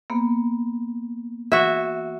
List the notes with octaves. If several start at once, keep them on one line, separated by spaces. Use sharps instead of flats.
A#3 B3
E3 F#4 E5